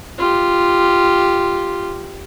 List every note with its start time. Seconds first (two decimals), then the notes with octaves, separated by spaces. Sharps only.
0.18 F4 G4